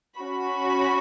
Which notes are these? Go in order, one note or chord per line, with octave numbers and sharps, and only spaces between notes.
C#4 F#4 B5